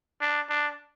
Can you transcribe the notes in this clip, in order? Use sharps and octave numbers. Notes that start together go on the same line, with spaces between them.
D4
D4